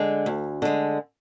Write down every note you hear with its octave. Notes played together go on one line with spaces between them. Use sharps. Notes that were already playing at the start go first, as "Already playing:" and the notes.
Already playing: D3 G#3
D2
D3 G#3